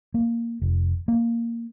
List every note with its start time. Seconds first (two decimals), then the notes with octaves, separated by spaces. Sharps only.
0.14 A#3
0.62 F1
1.08 A#3